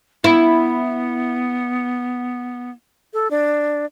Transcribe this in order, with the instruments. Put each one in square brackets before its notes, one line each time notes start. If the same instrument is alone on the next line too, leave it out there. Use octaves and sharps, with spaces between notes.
[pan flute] B3 [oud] E4
[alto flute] A4
D4